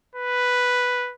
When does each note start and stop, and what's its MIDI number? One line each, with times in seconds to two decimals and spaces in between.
0.15 1.13 71